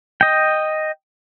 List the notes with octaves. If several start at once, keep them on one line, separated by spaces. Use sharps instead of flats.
D#5 G5